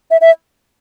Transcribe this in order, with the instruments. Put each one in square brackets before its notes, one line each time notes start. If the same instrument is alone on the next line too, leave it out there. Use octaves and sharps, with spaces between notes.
[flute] E5
E5